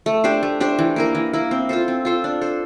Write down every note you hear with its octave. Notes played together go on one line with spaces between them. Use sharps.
A3
D4 G4 C5
A3
D4 G4 C5
E3
A#3 E4 A#4
E3
A#3 E4 A#4
C4
F4 A4 C5
C4
F4 A4 C5
D4
A4 C5